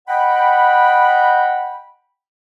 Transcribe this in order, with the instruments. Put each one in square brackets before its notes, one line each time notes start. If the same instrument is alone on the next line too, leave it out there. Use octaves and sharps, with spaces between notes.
[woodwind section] D#5 F#5 G5 B5